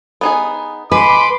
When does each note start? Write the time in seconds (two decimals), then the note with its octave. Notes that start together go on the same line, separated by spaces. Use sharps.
0.21 B3 D#4 G#4
0.92 G#3 B4 B5 C6 D6